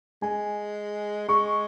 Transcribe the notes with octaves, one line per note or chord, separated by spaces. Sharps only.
G#3 G#5
G#3 C#6